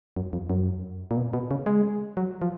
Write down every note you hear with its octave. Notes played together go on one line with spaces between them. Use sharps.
F#2
F2
F#2
A#2
B2
B2
C#3
G#3
F#3
F3